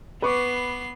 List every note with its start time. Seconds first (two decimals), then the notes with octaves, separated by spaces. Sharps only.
0.22 B3 B4 C#6 D6 C7